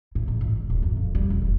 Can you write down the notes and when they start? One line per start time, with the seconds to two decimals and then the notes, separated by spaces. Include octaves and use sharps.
0.15 A2
0.28 C#2
0.41 G#2
0.55 G1
0.70 D1
0.82 F#2
0.97 F2
1.15 G3
1.30 D#1
1.42 E1